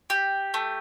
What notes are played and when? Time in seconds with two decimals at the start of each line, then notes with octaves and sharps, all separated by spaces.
0.10 G4
0.54 A3